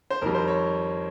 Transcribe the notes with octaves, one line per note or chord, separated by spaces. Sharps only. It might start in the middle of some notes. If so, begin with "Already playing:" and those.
C5
F2 D#3 G3 A#4
C5
C#5